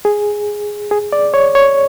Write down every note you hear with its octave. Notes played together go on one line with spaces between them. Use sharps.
G#4
G#4
D5
C#5
C#5